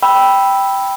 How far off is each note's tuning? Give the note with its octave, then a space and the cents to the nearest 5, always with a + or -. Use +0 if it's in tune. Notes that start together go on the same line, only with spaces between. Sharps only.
G5 +0 B5 +0 E6 +0